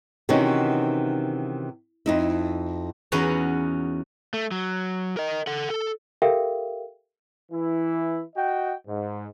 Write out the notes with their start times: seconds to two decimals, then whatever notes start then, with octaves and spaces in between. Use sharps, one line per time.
0.29 C3 D#3 E3 C#4 D#4 F#4
2.06 F2 D#4 E4
3.12 E2 C#4 D#4 F#4 B4 A#5
4.34 A3
4.51 F#3
5.17 A#4 D#5
5.47 A4 F#5
5.70 A4
6.22 G4 A4 A#4 E5 F5 G5
7.52 E3 E4
8.36 F#4 D#5 G5
8.87 G#2